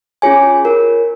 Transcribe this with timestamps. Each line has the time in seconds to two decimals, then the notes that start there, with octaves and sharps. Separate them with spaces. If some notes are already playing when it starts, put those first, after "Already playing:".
0.22 C#4 F4 G#4 C#5 G#5
0.65 F4 A#4 C#5